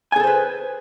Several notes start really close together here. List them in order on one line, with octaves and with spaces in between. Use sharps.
G#5 G#4 A4 C5 B4